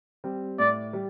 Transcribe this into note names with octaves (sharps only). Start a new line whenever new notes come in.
G3 C4
A2 D5
G3